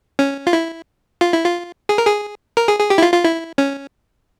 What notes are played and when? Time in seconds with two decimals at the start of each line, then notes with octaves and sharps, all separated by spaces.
0.19 C#4
0.47 F4
0.53 E4
1.21 F4
1.33 E4
1.44 F4
1.89 G#4
1.98 A#4
2.07 G#4
2.57 A#4
2.68 G#4
2.79 G#4
2.90 G4
2.98 E4
3.03 F4
3.13 F4
3.24 E4
3.58 C#4